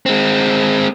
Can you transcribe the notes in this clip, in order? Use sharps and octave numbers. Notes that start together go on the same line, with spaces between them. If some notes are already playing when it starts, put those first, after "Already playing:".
G#3 C4